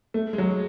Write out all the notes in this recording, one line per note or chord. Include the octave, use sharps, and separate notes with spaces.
A3
G#3
F#3